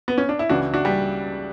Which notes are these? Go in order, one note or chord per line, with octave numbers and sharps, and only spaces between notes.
B3
C#4
D4
E4
C#2 C#3 E3 D4 F#4
D4 F#4
G3